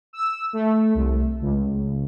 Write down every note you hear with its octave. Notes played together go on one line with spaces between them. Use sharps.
E6
A3
C2
C#2